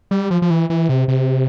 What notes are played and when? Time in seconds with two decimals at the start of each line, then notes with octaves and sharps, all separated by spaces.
0.11 G3
0.31 F3
0.42 F3
0.50 E3
0.70 E3
0.89 C3
1.08 C3